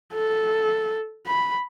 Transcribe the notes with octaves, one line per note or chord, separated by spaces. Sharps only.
A4
B5